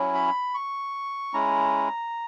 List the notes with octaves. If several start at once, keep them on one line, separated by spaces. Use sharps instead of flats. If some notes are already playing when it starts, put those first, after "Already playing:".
Already playing: F#3 C#4 E4
B5
C#6
G#3 C#4 E4 A#5